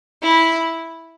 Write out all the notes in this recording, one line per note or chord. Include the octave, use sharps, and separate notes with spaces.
E4